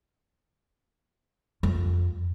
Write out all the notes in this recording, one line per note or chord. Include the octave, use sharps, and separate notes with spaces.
F2